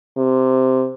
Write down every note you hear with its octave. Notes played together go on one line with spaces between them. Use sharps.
C3